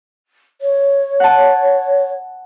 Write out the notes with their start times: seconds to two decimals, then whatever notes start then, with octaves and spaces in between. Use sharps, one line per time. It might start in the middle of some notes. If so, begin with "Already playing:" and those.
0.61 C#5
1.20 F#5 A5